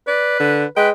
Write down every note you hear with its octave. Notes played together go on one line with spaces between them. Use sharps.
B4 D5
D3
G#3 B4 G5